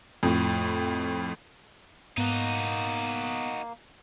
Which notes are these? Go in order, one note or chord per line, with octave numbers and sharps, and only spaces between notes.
F2 A2
G#2 A#3 B3 D#4 F#4